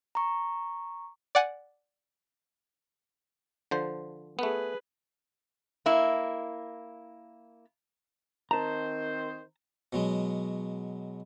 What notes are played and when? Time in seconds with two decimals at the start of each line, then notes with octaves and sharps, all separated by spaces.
0.15 A#5 C#6
1.35 D5 F#5 G#5
3.71 D3 F3 C5
4.39 A3 B3 G#4 B4
5.86 A#3 E4
8.51 D#3 C4 C5 A5 A#5
9.93 B2 F#3 G#3